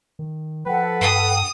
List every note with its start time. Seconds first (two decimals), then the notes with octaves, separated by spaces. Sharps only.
0.19 D#3
0.66 F3 A4 B4 F#5 G5
1.01 G2 D#6